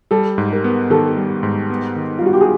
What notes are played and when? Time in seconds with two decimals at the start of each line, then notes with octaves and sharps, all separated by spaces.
0.11 G3 A4
0.38 G#2
0.51 A#4
0.64 B3
0.90 D#3 A4
1.17 G3
1.43 G#2
1.70 B3
1.96 D#3
2.18 F4
2.22 G3 F#4
2.33 G4
2.41 G#4